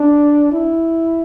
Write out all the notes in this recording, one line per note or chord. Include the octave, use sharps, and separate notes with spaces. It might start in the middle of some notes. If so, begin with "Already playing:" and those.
Already playing: D4
E4